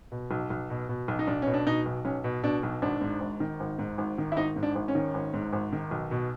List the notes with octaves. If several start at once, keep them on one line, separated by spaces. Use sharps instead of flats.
B2
B1
B1
B2
B2
B1
D#4
B1 D4
B2 C#4
D4
B2 D#4
B1
B1 C#4
B2
B2 D4
B1
G#1 D4
G#2
G#1
D#3
G#1
G#2
G#1
D#3
E4
G#1 D#4
G#2
D4
G#1
C#4
D#3
G#1
G#2
G#1
D#3
B1
B2